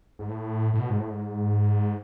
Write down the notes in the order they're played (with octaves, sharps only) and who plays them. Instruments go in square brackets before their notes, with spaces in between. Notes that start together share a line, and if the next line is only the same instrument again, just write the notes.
[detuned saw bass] G#2
A2
A2
B2
G#2
A2
G#2